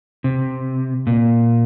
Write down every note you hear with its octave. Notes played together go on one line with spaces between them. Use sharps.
C3
A#2